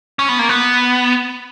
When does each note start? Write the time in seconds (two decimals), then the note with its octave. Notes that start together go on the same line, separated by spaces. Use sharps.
0.19 C#4
0.29 B3
0.39 A#3
0.49 B3